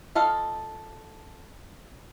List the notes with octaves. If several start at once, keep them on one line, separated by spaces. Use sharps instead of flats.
F4 A4 D#5 F5